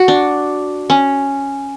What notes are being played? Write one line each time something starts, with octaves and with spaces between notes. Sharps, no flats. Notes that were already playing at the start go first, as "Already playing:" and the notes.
Already playing: F#4
D4
C#4